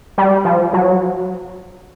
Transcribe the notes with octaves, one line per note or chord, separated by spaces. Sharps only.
G3
F3
F#3